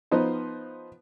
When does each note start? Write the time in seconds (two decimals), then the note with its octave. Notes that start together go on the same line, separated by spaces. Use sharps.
0.11 F3 B3 D#4 C5